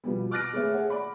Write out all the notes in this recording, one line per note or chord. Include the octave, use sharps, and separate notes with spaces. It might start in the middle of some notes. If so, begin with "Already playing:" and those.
B2 F3 G3 B3
D6 F6 F#6 A6 A#6 D7
A3 B3 G#4 C#5 E5
G#4 C#5 F#5
D5 B5